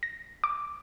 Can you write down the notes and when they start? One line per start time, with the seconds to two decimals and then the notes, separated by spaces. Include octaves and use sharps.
0.03 A#6
0.44 D6